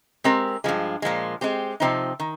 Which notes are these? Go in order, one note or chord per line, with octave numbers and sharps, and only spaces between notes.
G#3 C4 G4 A#4
G2 F3 G#3
A#2 F3 G#3
G#3 C4 G4
C3 F3 C4 D#4
D#3